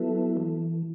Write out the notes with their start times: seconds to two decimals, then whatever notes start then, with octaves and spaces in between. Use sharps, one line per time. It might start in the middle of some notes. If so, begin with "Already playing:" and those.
Already playing: F#3 B3 E4 A4
0.37 E3